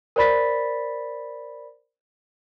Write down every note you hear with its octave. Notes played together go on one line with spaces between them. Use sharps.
A#4 C5 D5 B5 A6 B6